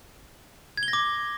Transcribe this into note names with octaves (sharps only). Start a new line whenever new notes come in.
G#6
G7
A#6
D6